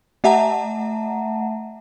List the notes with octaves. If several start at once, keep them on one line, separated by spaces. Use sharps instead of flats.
A3 E5 F#5 A5 A#5